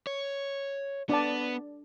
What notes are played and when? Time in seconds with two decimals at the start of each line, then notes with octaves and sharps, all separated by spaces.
0.07 C#5
1.09 B3 D4 D5 A5